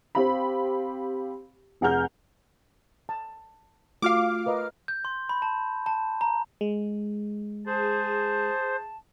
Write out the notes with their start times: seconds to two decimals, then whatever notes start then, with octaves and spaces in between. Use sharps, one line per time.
0.15 C4 G4 F5 B5
1.81 F1 G#4 F#5 A#5 F6 G6
3.09 A5
4.02 A3 F4 F#4 F5 D6 F6
4.46 A#4 B4 D#5
4.88 G6
5.05 C6
5.29 B5
5.42 A5
5.86 A5
6.21 A#5
6.61 G#3
7.66 G#4 C5 A5